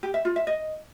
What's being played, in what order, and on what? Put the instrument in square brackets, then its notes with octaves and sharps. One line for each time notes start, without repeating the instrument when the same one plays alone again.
[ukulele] G4
E5
F4
E5
D#5